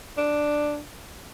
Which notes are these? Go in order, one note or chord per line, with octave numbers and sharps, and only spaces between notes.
D4